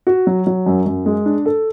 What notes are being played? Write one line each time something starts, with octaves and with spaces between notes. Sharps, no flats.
F#4
F#3
F#3
F#2
F#2
G#3
D4
A4